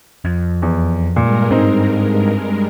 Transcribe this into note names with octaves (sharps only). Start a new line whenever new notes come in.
F2
E2
G2 A#2 G#3 A#4
G#2 C4 D#4